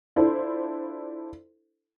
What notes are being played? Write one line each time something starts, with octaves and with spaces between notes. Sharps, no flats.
D4 E4 F4 A4 C5